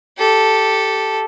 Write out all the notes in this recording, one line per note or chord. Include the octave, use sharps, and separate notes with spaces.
G4 A4